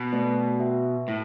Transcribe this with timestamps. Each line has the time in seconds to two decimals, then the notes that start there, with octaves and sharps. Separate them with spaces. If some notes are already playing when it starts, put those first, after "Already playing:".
Already playing: B2
0.13 A3 C4 F#4 B4 D5
0.60 F#4 B4 E5 G5
1.08 A2 A3 E4